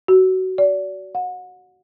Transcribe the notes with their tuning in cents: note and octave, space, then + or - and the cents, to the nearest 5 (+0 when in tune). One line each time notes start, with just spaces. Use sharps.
F#4 +20
D5 -30
F#5 -30